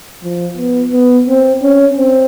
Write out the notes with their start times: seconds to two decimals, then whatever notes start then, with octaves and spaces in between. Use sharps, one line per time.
0.23 F3
0.57 B3
0.93 B3
1.27 C4
1.62 C#4
1.98 C4